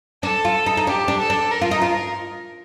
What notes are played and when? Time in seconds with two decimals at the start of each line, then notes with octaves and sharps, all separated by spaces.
0.23 D4 A4
0.45 F4
0.66 D#4
0.77 D#4
0.87 D4 G4
1.08 D4
1.20 A4
1.30 D4
1.51 A#4
1.61 F4
1.71 D#4
1.82 F4